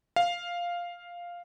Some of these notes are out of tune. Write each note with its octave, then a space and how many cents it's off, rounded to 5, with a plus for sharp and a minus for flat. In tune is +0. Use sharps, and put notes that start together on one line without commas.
F5 +0